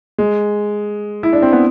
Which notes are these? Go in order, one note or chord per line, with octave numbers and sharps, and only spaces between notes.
G#3
E4
D4
C4
B3